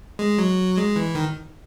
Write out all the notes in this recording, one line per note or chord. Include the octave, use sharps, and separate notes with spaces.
G#3
F#3
G#3
E3
D#3